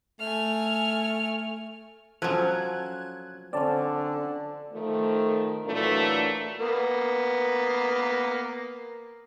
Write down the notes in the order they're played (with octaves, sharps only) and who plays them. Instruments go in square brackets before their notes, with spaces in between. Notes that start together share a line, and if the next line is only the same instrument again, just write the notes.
[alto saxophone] A3 [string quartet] G#5 F6
[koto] F3 F#3 [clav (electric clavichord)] C#4 F4 A4 [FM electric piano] F#6 G#6
[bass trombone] D3 [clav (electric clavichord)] C4 C#4 [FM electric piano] D5 A5
[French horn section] D#3 F3 A3
A#2 E3 F#3 A3 D4
[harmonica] A#3 B3